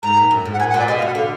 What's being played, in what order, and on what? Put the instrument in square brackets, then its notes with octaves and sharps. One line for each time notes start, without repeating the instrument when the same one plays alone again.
[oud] G#2 [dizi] A#5
[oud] A#2
F#2
G#2
[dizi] F#5
[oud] A#2 [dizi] G#5
[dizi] F#5
[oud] A#2
[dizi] D5
[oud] B2 [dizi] D#5
[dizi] F5
[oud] B2 [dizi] F#5
[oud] D3 [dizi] F5